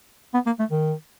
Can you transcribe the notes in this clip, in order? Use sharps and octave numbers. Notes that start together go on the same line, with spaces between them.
B3
A#3
A3
D#3